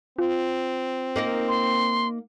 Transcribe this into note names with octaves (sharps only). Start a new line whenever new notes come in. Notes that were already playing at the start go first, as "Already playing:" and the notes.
C4 F4
A#3 D#4 A#4
C6